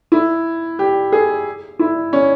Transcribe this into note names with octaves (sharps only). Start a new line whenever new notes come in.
E4
G4
G#4
E4
C#4